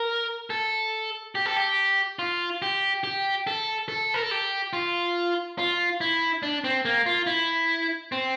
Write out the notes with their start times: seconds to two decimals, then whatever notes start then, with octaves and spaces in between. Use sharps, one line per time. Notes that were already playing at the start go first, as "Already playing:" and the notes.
Already playing: A#4
0.50 A4
1.35 G4
1.46 A4
1.56 G4
2.19 F4
2.62 G4
3.04 G4
3.47 A4
3.88 A4
4.14 A#4
4.22 A4
4.31 G4
4.73 F4
5.58 F4
6.01 E4
6.43 D4
6.64 C4
6.85 A#3
7.06 F4
7.27 E4
8.12 C4